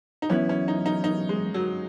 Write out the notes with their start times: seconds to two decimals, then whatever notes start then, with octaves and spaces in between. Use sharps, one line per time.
0.22 D#4
0.30 F#2 E3 B3 C#4 E4
0.49 C#4
0.68 D#4
0.86 D#4
1.04 D#4
1.29 G#3
1.54 F#3